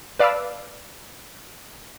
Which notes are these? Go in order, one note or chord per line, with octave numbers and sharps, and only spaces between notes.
B4 D5 F5 A5 D6 E6